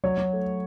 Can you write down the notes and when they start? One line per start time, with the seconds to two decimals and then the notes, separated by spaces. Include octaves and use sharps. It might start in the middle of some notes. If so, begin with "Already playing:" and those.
0.04 F#3 C#5
0.18 F#3
0.33 A3